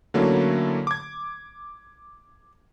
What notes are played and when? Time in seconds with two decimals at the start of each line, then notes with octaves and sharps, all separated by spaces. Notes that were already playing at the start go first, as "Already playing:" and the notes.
0.14 D3 F#3 A3 A#3 C#4 E4
0.87 D6 G#6